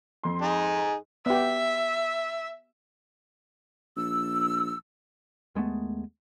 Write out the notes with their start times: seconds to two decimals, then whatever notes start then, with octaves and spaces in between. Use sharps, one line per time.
0.23 F2 C6
0.42 D#4 G#4
1.26 B3 G4 E5
3.96 A#1 E6
5.55 D#2 G#3 A3 B3